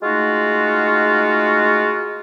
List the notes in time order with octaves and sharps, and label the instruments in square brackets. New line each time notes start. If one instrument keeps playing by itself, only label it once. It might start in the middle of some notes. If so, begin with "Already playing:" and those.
[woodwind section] G#3 A3 D#4 F4 F#4